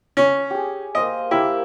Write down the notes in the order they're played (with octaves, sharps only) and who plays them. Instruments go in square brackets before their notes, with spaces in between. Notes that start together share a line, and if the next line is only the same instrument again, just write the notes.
[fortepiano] C#4
[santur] G4 G#4
[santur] A#3 C5 F5 [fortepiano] D#5
[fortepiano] E4 [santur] G4 A#4 D6